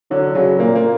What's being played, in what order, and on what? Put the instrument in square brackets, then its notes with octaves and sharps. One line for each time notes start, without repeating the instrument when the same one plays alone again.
[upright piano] D3 [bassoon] F#3
[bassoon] C#3 [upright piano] F#3
[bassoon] A#2 [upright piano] A#3
[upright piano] A#3